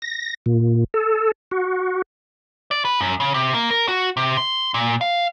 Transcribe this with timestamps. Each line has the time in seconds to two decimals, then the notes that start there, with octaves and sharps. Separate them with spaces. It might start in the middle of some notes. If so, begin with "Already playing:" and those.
0.02 A#6
0.46 A#2
0.94 A4
1.51 F#4
2.71 D5
2.85 B4
3.01 F#2
3.20 C#3
3.34 C3
3.54 A#3
3.71 A#4
3.88 F#4
4.17 C3
4.37 C6
4.74 A#2
5.01 F5